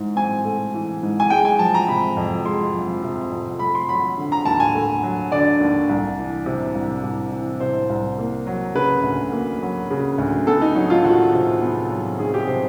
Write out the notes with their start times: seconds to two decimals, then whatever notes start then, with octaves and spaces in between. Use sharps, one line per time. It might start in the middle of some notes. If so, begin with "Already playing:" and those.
Already playing: G#2 E3
0.16 C4 G#5
0.44 A3
0.74 E3
1.03 G#2
1.20 G#5
1.30 G#3 G5
1.45 G#5
1.59 F3 A5
1.74 A#5
1.88 C3 B5
2.17 F2
2.45 G#3 C6
2.74 F3
3.02 C3
3.32 F2
3.59 A3 B5
3.75 C6
3.88 F#3 B5
4.17 D3
4.32 A#5
4.45 D#2 A5
4.60 G#5
4.74 A3
5.03 F#3
5.32 D3 D5
5.60 D#2
5.89 C2
6.18 E3
6.46 C3
6.75 C2
7.04 C2
7.32 E3
7.60 C3 C5
7.90 C2
8.19 A#3
8.47 F#3
8.75 C#3 B4
9.03 D2
9.32 A#3
9.62 F#3
9.91 C#3
10.18 D2
10.47 B3 A4
10.62 D#4
10.75 F#3 D#4
10.90 F4
11.04 D#3 F#4
11.33 C3
11.62 B3
11.91 F#3
12.19 D#3 G#4
12.34 G4
12.47 C3 C5